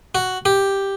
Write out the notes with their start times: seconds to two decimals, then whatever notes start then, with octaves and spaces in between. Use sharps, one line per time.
0.15 F#4
0.46 G4